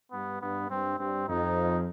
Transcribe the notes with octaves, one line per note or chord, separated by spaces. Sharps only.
G2 B3
G2 B3
G2 C4
G2 C4
F2 D#4